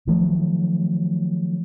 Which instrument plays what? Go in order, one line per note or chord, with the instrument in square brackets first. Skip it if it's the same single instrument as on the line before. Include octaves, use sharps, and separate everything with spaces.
[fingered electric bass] D#3 F3 F#3 A3